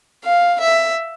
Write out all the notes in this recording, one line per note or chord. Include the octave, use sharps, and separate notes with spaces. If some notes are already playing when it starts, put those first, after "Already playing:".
F5
E5